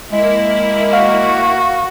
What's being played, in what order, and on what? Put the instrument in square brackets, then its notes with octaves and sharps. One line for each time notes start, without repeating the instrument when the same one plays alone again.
[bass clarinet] G#3 [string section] A#3 E4
[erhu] F#4 [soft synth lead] F5